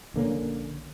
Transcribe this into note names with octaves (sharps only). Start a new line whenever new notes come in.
A#1 D3 A#3 C#4